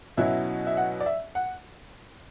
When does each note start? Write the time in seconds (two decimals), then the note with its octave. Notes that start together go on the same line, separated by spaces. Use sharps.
0.17 B2 F#3 C#4 E4 E5
0.67 E5
0.77 F#5
1.00 D5
1.06 E5
1.35 F#5